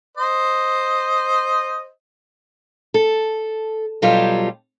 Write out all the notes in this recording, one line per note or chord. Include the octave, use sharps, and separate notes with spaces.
C5 D#5
A4
B2 F#3 G3 F4 G4 A4